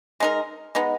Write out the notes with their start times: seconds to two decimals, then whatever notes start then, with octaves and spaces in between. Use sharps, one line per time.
0.20 G#3 D#4 A#4
0.75 G#3 B3 D#4